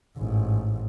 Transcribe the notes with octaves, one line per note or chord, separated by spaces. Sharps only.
A1 G#2